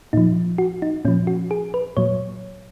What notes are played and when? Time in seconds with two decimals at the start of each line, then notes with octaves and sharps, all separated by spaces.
0.13 A#2 F3 D#4
0.58 F#4
0.82 D#4
1.05 A#2 C#4
1.08 F3
1.27 F#4
1.51 G#4
1.74 B4
1.97 A#2 F#3 C#5